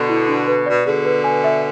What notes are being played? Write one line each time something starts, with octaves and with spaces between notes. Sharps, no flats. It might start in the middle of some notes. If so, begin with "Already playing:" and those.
Already playing: B2 D3
E4
D4
B4
B2 D5
B2 D3 G#4
B4
G#5
E5